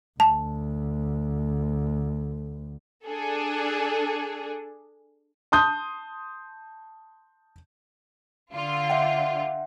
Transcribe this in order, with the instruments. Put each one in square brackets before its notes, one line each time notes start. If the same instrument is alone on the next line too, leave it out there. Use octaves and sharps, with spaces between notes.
[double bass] D2 [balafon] A5
[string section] D4 G#4 A4
[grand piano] A5 C6 D#6 G6
[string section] D3 F4
[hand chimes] E5 F#5 G5